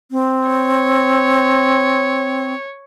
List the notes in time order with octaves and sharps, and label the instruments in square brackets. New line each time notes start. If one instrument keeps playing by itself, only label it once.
[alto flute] C4
[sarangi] C#5